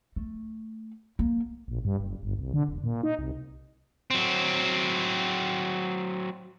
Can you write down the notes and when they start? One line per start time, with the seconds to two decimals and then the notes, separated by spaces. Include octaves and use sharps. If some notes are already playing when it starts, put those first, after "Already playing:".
0.16 A3
1.19 A#3
1.68 A#1
1.85 G2
2.00 F#1
2.23 G1
2.39 C2
2.54 D3
2.68 E1
2.84 A#2
3.03 D#4
3.19 C2
4.11 F#3 C4